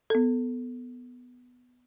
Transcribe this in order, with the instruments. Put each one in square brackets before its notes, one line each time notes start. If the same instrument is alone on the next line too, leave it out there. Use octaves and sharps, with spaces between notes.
[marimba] B3 A4